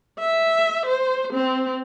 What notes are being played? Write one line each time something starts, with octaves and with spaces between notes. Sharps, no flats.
E5
C5
C4